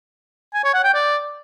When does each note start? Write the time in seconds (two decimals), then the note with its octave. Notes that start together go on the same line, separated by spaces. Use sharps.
0.54 G#5
0.64 C#5
0.74 F#5
0.84 G5
0.94 D5